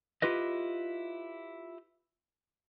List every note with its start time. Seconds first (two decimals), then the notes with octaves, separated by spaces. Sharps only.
0.22 E4 F4 G4 B4 D#5